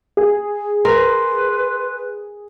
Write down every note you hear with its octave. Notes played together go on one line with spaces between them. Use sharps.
G#4
A#4 B4 C6